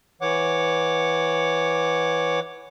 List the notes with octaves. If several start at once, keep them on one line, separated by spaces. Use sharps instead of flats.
E3 C#5 F#5 D6